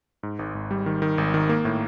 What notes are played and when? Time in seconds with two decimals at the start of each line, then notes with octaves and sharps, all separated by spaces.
0.23 G#2
0.39 G#1
0.55 G#1
0.71 G3
0.86 D#3
1.02 D#3
1.18 G#1
1.34 D#3
1.49 A#3
1.65 A2